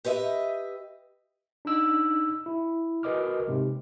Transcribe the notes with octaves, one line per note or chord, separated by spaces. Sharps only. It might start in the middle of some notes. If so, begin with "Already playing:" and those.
G4 B4 D#5 E5
D4 D#4 E6
E4
F#4 A#4 B4 D#5 D6 F6
G#2 C3